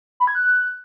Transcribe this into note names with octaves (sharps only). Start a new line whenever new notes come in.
B5
G#6
F#6